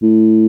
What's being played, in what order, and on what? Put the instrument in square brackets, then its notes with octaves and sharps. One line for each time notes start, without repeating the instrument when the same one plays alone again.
[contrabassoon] A2